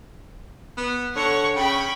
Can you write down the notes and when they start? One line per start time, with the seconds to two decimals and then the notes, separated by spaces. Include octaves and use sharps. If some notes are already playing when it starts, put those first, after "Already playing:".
0.77 B3
1.16 D3 C#5 F#5 C#6
1.55 C#3 G5 B5 C#6